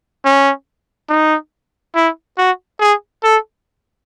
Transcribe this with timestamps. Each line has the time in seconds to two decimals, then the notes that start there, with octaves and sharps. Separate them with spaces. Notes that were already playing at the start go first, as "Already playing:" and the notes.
0.25 C#4
1.09 D#4
1.95 E4
2.38 F#4
2.80 G#4
3.23 A4